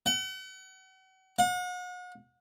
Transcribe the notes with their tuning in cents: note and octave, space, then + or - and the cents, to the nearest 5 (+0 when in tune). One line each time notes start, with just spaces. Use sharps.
F#5 +40
F#5 -40